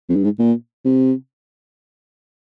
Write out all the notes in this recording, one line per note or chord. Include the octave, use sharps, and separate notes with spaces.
F2
G2
G#2
A#2
C3